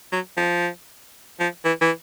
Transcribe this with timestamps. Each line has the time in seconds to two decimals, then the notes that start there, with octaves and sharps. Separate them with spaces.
0.12 F#3
0.37 F3
1.40 F3
1.65 E3
1.81 E3